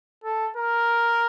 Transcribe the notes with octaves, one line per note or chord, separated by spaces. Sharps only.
A4
A#4